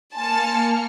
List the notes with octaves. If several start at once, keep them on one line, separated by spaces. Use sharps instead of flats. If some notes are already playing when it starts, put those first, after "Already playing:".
A#3 G#5 A5 C6 F6 C#7